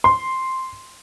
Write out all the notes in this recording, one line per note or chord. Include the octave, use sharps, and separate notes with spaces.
C6